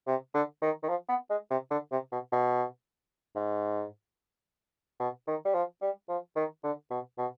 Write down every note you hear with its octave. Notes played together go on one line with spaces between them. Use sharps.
C3
D3
D#3
D#3
F3
B3
G#3
C3
D3
C3
B2
B2
G#2
B2
D#3
G3
F3
G3
F3
D#3
D3
B2
B2